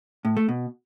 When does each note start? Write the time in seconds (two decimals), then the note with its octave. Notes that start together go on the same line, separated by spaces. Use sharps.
0.25 A2
0.37 A3
0.49 B2